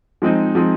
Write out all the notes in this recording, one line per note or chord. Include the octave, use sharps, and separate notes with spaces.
F3 G#3 C4 D#4
F3 G#3 C4 D#4